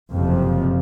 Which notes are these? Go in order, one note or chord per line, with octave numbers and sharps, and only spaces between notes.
F#1 F2 C3 F3